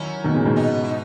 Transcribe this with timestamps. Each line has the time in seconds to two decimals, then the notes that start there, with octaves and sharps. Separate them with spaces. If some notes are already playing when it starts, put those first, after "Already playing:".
Already playing: D#3 F#3 C#4 E4
0.24 B2 D#3
0.34 A#2 C#3
0.45 G#2 B2
0.56 B3 D#4
0.83 E4
0.89 D#4